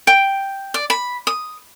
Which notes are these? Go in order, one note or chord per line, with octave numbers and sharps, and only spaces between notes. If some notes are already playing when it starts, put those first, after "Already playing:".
G5
D5
B5
D#6